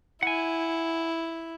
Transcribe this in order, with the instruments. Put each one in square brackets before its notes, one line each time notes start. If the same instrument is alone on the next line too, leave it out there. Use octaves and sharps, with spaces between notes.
[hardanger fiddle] E4 [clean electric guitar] F#5 G#5